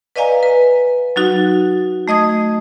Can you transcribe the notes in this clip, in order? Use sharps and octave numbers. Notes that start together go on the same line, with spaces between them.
B4 D5 D#5 F5 G#5 A#5
B4
F#3 D#4 F#4
A3 D#5 D#6 G#6